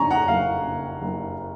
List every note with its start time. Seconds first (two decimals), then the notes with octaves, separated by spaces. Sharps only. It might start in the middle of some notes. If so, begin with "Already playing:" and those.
Already playing: F2 C#3 G#5 A#5 C#6
0.10 F#5 A#5
0.28 F#1 F5
0.65 C#3
1.01 F#1